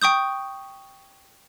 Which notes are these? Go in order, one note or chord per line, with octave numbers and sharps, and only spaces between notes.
G5 C#6 D#6 G6